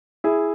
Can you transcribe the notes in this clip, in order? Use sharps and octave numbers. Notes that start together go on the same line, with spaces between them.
E4 G#4